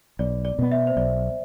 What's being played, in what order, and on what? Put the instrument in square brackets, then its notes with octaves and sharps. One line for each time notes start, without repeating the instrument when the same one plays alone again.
[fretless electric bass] B1 [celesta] D5
[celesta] D5
[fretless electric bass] B2 B3
[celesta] E5
C5
[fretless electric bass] B1 [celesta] D5